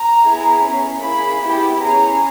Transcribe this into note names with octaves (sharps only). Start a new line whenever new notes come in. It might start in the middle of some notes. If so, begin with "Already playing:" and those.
Already playing: A#5
B3 E4 G#4
C#4 G#4
A#3 E4 G#4 B5
B3 E4 G4 B5
C#4 G#4 A#5